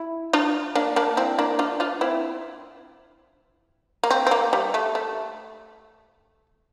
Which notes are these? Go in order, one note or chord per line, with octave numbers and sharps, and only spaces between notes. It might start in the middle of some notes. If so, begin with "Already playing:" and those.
Already playing: E4
D4 F4
A#3 D4
A#3 D4
C4 E4
A#3 D4
D4 F4
D4 F4
C4 E4
A#3
C4
C4
A#3
G3
A3
A3